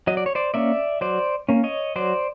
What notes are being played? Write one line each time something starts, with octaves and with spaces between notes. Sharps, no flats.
F#3 D#5
D5
C#5
C5 D5
A#3 C#4 D5 E5
F#3 C5 D5
A#3 C#4
C#5 D#5
F#3 C5 D5